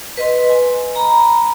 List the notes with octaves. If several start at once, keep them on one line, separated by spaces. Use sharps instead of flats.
B4 D#5 C6
G#5
A#5 B5